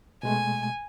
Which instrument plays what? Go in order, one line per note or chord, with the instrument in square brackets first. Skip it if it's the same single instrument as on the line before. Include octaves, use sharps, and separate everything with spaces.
[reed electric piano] B2 G#3 A3 [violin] G#5